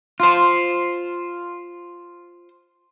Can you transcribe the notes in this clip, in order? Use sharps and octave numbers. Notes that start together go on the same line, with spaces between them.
F4 C5